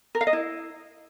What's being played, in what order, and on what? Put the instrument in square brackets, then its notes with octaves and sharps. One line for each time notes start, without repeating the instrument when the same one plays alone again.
[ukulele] A#4
F5
D#5
E4